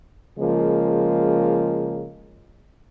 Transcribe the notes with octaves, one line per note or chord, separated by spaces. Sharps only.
C#3 F3 G#3 A#3